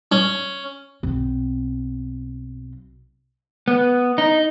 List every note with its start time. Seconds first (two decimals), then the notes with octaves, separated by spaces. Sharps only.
0.12 C#4
1.03 B1 C4
3.68 B3
4.18 D#4